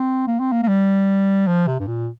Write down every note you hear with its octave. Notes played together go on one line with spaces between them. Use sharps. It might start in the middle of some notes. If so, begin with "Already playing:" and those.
Already playing: C4
A#3
C4
A#3
A#3
G3
F3
C3
G2
A#2